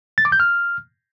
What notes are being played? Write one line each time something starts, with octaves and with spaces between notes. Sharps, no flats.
A6
D6
G6
F6